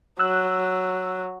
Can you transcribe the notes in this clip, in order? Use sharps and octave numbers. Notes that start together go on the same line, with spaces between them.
F#3 E6 F#6